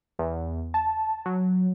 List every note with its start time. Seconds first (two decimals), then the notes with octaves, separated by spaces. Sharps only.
0.19 E2
0.74 A5
1.26 F#3